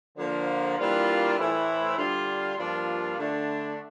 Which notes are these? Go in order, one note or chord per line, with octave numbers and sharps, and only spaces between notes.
D3 F3 A#3
E3 G3 A#3 D4 F4
A2 E3 A3 C4 E4
D3 G3 D4 F4
G2 F3 A#3 D4 F4
D3 A3 D4